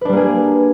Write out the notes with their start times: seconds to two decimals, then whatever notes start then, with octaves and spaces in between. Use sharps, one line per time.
0.01 B4
0.05 D4
0.09 G3
0.13 A#3
0.17 G#4